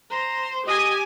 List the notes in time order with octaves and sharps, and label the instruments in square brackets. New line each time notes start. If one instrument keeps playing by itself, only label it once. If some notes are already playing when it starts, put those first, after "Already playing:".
[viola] C5 [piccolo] A#5
[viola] G4 G#5 [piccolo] D#5